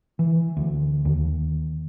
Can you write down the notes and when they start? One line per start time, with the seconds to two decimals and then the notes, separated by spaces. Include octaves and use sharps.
0.19 E3
0.57 D2
1.05 D#2